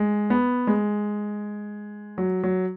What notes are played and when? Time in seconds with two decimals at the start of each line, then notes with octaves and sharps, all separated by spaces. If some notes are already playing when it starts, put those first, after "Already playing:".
Already playing: G#3
0.30 B3
0.67 G#3
2.18 F#3
2.43 F#3